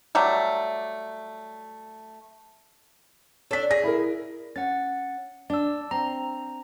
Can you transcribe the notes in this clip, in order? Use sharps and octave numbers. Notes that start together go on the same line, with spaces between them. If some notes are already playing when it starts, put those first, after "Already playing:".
F#3 G3 A3
D4 A4 C#5 B6
G#4 A#6
E4 A#4
C#4 F#5 A6
D4 D5 E6
C4 A#5